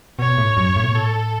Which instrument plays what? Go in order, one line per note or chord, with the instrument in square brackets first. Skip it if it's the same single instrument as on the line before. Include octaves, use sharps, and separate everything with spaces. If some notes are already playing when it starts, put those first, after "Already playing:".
[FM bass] B2 [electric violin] C#5
[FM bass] A2
F#2
A2
B2
[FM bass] A2 [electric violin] A4